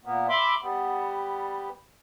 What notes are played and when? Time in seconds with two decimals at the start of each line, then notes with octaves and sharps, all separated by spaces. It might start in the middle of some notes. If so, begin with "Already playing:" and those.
0.05 A#2 A#3 B3
0.29 E5 B5 C6 D6
0.62 G3 B3